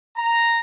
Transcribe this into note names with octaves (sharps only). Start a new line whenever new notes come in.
A#5